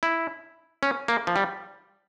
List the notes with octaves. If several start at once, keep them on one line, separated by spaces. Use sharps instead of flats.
E4
C#4
A#3
F3
G3